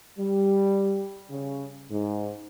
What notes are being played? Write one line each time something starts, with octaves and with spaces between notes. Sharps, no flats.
G3
C#3
G#2